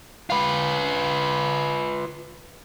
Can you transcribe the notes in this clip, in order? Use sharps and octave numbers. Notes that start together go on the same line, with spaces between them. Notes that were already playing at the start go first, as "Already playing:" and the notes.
F4 B4